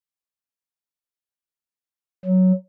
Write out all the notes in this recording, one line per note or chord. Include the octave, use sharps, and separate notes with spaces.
F#3